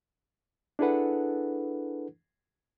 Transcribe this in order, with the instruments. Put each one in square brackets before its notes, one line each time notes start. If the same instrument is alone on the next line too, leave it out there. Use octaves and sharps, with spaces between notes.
[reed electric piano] D4 E4 G#4 A4 B4 F#5